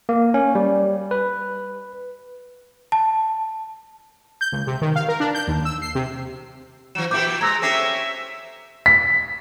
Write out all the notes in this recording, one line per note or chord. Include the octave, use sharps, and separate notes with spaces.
A#3
C#4
G3
B4
A5
G6
C#2
C3
D#3
F5
A#4
D4
G6
D#2
E6
C7
C3
E3 F#3 E7
A#2 E4 G4 D6 G6
G#3 A#5 E6 G#6
C4 C#4 G4 A4 E5 A#6 C7
B6